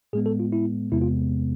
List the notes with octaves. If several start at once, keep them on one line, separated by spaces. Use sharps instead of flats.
A2 G#3 B3 G#4
A4
F4
E4
E2 C3 G#3 B3 E4
F4